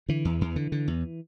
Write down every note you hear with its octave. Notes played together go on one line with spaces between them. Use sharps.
D3 E3
E2
E2
D3
D3
E2